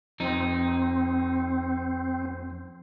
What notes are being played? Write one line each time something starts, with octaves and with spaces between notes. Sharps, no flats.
F2 C4 D#4